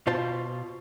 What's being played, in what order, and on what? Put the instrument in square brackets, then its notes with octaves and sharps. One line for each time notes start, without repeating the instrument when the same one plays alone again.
[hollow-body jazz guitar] B2 F4 C5 A5